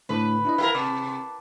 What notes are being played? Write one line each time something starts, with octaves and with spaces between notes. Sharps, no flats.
A2 D3 A3 B4
D4 E4 D#5
E4 G4 A#4 B4 E5 F5
C3 A5 D6